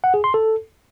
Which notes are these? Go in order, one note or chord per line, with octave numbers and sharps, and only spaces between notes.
F#5
G#4
C6
A4